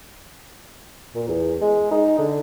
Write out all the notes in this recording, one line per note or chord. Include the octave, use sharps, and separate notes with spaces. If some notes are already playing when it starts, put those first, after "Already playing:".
A#2
E2
G#3
D#4
D3